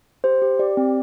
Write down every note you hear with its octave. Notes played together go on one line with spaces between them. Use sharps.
G4 C5
G4
G4 D5
C4